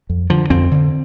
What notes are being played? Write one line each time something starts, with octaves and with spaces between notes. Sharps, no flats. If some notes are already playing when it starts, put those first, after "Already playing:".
F2
D3 F3
F2 C4
D3